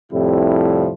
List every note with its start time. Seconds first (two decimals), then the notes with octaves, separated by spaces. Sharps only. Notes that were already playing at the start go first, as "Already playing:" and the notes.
0.13 F2 A2 C3 F3 G3 E4